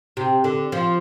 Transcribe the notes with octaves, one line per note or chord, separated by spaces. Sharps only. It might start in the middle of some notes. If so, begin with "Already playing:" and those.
C3
D3
F3